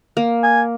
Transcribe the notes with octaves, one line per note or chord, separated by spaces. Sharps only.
A#3
G#5